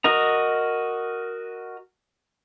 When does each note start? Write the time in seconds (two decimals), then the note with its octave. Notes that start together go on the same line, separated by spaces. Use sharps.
0.04 F#4 A#4 D#5 A#5